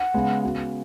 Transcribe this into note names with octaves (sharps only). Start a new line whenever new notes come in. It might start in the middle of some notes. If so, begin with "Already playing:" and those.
Already playing: F#5
C#3 G#3 B3
C#3 B3 F#4